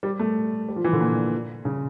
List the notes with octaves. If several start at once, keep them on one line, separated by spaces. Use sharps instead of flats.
G3
A3
G3
F3
E3
D3
A#2
C#3